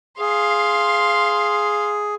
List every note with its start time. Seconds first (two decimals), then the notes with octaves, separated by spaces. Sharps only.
0.19 G#4 F5 C6